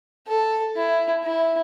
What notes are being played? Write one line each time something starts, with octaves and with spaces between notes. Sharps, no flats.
A4
E4
E4